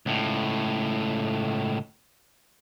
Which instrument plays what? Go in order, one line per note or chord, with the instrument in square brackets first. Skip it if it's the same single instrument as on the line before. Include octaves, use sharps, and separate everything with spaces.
[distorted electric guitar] C#2 A2